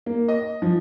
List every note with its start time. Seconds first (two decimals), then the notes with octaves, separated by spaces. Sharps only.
0.06 A#3
0.28 D#5
0.62 F3